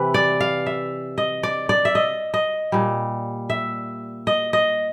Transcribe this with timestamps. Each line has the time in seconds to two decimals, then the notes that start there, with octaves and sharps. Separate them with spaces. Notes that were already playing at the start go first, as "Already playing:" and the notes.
Already playing: C3 E3 B4
0.14 D5
0.40 F5
0.66 E5
1.18 D#5
1.43 D5
1.69 D5
1.85 E5
1.95 D#5
2.34 D#5
2.72 A#2 G3
3.50 E5
4.27 D#5
4.53 D#5